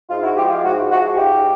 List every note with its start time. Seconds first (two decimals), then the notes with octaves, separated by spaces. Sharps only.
0.10 G#2 D#4 F4
0.23 E4 F#4
0.36 F3 F4 G4
0.41 G#3
0.49 F4 G4
0.63 G#2 E4 F#4
0.90 F3 G#3 E4 F#4
1.16 G#2 F4 G4